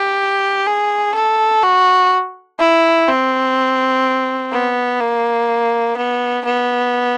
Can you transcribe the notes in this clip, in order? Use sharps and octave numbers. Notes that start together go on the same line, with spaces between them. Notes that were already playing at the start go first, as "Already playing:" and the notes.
Already playing: G4
G#4
A4
F#4
E4
C4
B3
A#3
B3
B3